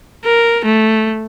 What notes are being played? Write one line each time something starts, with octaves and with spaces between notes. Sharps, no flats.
A#4
A3